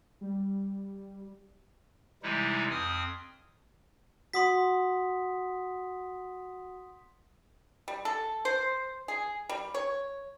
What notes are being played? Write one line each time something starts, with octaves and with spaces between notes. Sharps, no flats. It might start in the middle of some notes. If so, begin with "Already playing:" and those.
G3
C3 E3 G3 G#3 D#4 E4
F2 C4 D#6 F6
F#4 F#5 C6 D#6 B6
G3
A4
C5
G#4
G3
C#5